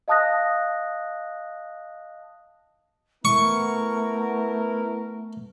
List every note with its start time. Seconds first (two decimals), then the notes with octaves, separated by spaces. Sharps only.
0.08 D#5 F5 A5 D#6 F#6 A#6
3.25 A3 B3 E4 A#4 C#6